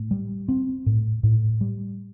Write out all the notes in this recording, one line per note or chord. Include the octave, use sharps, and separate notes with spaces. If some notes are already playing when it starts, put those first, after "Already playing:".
Already playing: A2
G3
C4
A2
A2
G3